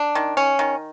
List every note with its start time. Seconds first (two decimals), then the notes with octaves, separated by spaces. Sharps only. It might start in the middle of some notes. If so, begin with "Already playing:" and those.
Already playing: D4
0.15 D#3
0.37 C#4
0.59 D#3